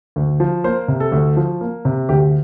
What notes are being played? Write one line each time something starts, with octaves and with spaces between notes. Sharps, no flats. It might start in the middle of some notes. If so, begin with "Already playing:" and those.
D2
F3
A#3 C5
C3
A4
D2
F3
A#3
C3
D2 G4